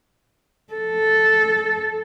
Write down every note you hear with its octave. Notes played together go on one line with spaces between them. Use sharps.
A4